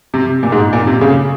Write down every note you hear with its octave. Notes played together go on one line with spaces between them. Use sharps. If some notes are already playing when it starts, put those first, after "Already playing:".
C3
A#2
G#2
A#2
C3
C#3